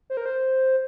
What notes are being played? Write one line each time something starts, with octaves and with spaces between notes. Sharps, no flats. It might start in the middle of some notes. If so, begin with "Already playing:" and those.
C5
A#4
C5